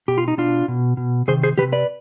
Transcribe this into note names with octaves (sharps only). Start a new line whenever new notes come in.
B2 G4
F4
D#4
B2 D4 F4
B2
B2
C3 D#3 G#4 C5
G#4 C5
D#3 G4 B4
C3
B4 D5